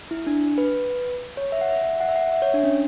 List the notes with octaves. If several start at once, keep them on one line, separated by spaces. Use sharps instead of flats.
E4
D4
B4
C#5
E5
F#5
E5
F#5
E5
F#5
E5
C#5
D4
C#4